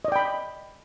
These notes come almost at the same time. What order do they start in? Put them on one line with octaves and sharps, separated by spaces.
D#5 D5 G5 B5